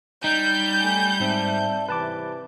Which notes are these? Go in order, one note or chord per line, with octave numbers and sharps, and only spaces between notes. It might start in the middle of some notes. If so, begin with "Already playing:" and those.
G3 D#4 G6
A3 G#5
G#2 C4 D5 E5 A5
C3 E3 B4 A5 D6